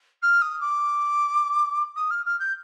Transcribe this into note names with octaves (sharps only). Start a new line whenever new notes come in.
F6
D#6
D6
D#6
F6
F6
G6